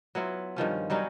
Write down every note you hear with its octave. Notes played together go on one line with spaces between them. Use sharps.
F#3 B3 E4 F4
G2 D#3 F3 C#4
F#3 G3 C#4 D#4